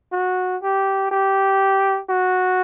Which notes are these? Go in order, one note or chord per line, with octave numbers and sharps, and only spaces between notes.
F#4
G4
G4
F#4